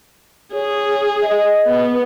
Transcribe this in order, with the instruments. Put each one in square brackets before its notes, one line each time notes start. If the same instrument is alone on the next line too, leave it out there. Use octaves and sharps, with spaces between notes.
[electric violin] G#4 [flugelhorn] C#5
[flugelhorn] D#5
[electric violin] B3